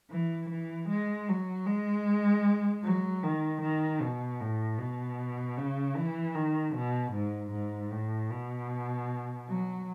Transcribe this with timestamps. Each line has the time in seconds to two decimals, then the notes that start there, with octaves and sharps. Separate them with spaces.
0.11 E3
0.50 E3
0.89 G#3
1.29 F#3
1.67 G#3
2.84 F#3
3.23 D#3
3.62 D#3
4.01 B2
4.41 A2
4.79 B2
5.58 C#3
5.96 E3
6.35 D#3
6.74 B2
7.13 G#2
7.52 G#2
7.91 A2
8.31 B2
9.48 F#3